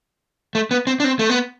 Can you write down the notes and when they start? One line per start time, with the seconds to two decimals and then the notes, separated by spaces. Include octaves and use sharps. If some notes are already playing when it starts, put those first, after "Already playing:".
0.55 A3
0.71 B3
0.87 C4
1.00 D4
1.04 C4
1.19 A3
1.29 B3